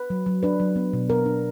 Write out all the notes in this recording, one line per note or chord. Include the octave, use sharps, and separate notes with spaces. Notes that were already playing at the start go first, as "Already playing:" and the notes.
Already playing: B4
F#3
F#3
D4 B4
F#3
B3
B2
B3 A#4
D4